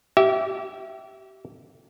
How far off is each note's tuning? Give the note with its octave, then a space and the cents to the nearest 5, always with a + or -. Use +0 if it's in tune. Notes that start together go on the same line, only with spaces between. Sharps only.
G4 -30 E5 +0